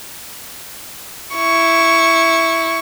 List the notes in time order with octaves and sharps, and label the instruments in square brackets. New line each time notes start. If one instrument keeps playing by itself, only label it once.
[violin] E4 C#6